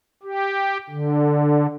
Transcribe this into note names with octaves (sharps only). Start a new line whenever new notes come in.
G4
D3